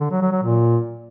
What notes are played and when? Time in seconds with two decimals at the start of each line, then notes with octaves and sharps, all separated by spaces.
0.01 D3
0.11 F#3
0.22 F#3
0.32 F#3
0.43 A#2